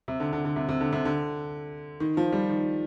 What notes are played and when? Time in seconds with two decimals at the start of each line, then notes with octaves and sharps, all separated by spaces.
0.08 C3
0.20 D3
0.33 D3
0.45 D3
0.56 C3
0.69 C3
0.81 D3
0.93 C3
1.05 D3
2.00 D#3
2.17 F3
2.32 G3
2.49 D#3